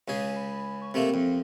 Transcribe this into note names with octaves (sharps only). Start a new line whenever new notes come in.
C#2 C#3 G#4
B5
C#6
C3 A3 A#3 C4
F2